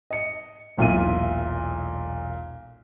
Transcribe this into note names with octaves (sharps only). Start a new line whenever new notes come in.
D#5 C#7
E1 B1 A#2 E4 F4 D#7